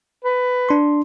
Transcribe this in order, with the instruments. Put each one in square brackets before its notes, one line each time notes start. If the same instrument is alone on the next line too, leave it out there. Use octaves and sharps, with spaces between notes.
[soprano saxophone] B4
[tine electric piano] D4 C6